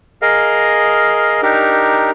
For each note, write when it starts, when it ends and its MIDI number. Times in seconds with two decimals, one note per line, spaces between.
0.22 1.41 68
0.22 1.41 70
0.22 1.41 75
0.22 1.41 77
1.43 2.11 62
1.43 2.11 63
1.43 2.11 67
1.43 2.11 70